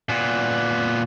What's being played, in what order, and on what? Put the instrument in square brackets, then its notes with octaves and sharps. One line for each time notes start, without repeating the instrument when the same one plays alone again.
[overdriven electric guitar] A#2 B3